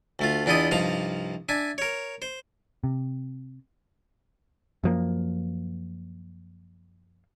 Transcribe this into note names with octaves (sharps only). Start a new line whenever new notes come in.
D2 A3 F4
E2 D4 E4 F4 D#5 D#6
C2 G2 F3 D#4 F5 A#5
D4 E5 G#5
A#4 C#5
C5
C3
F#2 F3 A#3